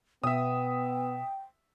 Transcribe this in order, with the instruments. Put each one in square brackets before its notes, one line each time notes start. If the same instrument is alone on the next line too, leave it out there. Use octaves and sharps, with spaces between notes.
[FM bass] B2 [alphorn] B3 [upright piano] E5 D#6 [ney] G5